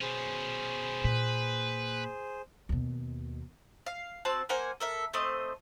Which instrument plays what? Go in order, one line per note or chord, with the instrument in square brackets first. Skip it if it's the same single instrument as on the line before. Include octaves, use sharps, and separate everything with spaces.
[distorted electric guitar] B2 C#4 [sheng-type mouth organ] G#4 C5
[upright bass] A#2 [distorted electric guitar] B4
[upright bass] D#2 B2
[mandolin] F5
C4 F#4 A5
A#3 C5 F#5 G#5
A4 A#4 E5
A3 C4 C5 D#5